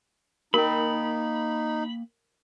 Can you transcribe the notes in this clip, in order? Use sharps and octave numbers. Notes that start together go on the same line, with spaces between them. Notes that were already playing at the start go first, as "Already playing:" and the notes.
A#3 D#4 A#4 G5 B5